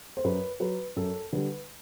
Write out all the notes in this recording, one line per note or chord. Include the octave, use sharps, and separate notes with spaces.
C5
F#2 B4
F#3 B4
F#2 A4
D3 G3 B4